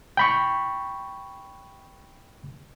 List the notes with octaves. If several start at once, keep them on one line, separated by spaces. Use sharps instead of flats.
G5 B5 C#6